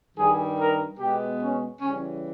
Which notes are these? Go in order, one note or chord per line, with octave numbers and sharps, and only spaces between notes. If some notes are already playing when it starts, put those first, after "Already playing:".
G2 D#3 G3 G#4
A#4
B2 G#3 B3 G4
C#4
C#3 E3 G3 C#4